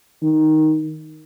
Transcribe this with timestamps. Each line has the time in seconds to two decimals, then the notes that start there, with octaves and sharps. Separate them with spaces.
0.22 D#3